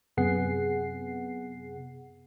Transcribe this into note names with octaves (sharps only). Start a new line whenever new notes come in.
F#2 C3 B3 G#4 F#5 C7